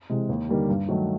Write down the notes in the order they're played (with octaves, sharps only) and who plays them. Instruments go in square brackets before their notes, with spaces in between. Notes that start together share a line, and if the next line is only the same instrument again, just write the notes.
[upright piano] C3 E3 G#3
D#2
D3 G3 A#3 D#4
G2
D#3 F#3 A3